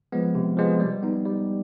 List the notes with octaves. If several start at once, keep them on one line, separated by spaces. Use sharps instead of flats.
F3 G#3 B3
C3
F3 G#3 B3
G3
B3 D#4
G3